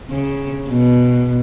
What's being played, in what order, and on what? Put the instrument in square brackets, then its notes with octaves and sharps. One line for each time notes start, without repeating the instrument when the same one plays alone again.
[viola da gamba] C#3
B2